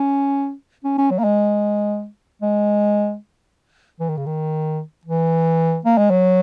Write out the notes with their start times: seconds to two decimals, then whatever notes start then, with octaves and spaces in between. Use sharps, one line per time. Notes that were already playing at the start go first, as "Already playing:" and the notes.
Already playing: C#4
0.84 C#4
0.98 C#4
1.11 F#3
1.19 A#3
1.24 G#3
2.42 G#3
4.00 E3
4.09 D#3
4.17 C#3
4.26 D#3
5.05 E3
5.85 A#3
5.98 G#3
6.10 F#3